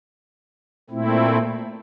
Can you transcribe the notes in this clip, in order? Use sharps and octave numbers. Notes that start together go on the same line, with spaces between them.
A#2 A3 C4 E4